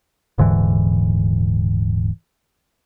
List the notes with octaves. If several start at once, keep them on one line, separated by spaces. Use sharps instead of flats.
D#1 G#2 D3 E3